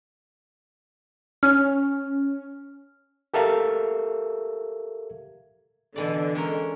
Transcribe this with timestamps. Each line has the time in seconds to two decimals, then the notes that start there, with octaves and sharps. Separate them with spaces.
1.43 C#4 F6
3.34 G4 A4 A#4 E5 F5
5.96 B2 D3 E3 D5
6.35 G#3 C#4 A#4